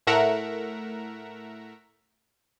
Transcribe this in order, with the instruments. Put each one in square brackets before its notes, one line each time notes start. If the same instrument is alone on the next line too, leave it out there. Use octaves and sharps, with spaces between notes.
[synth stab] A2 A3 A#4 E5 F#5 A#5